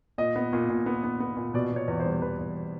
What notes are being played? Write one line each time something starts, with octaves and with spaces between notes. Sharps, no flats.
A#2 D#5
B3
A#2
A#2
B3
B3
B3
A#2
B2 D5
B2
C#5
E2
C5
G3
E2 B4
E2